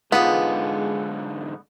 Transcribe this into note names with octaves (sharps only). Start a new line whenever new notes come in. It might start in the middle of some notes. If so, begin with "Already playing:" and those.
G#2 D3 G#3 B3 F4 G#4 D#6